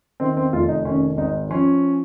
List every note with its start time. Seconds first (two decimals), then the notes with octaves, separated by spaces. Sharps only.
0.20 D#3 C4
0.37 C4
0.53 F1 F4
0.69 D#4
0.85 D#3 C#4
1.17 G#1 D#4
1.50 F3 C#4